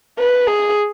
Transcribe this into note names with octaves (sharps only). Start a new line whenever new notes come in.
B4
G#4